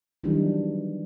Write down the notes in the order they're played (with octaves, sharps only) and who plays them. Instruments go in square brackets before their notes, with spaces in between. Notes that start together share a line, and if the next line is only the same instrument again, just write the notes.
[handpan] D#3 E3 F#3 G3 D4 D#4